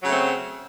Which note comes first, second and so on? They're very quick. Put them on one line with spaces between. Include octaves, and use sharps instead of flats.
F#3 C#3 A3 C4